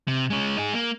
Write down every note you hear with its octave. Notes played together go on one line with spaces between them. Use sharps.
C3
G#3 C#4
D#4 G#4
A#3